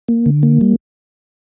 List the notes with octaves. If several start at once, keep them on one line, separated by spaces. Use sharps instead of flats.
A#3
D3
A#3
G3